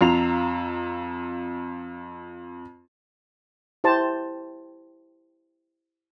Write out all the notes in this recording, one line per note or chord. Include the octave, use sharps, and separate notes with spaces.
F2 F4 A#5 C7 F7
E4 G4 C5 A5